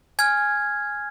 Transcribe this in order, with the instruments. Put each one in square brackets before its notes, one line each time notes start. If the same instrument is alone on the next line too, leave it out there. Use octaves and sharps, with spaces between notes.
[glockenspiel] G#5 F6 G#6